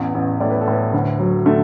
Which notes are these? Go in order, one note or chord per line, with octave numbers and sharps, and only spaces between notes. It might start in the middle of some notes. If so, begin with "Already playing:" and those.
Already playing: A1 E2
A1
A2 D5
B4
A4
A2 B4
D2
F#3
D3 A3